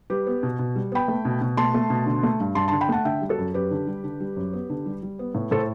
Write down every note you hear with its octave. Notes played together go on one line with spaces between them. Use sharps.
G3 G4 B4
B3
B2
B2
G3
B3 G5 B5
A3
B2
B2
A3 A5 C6
A3
B2
D3
A3
G2
G2 A5 C6
D3 A5 C6
G5 B5
A3 F#5 A5
D3 E5 G5
G3
F#4 A4
F#2
F#2 G4 B4
D3
G3
D3
G3
F#2
B3
D3
G3
G3
B3
A2
A2 A4 C5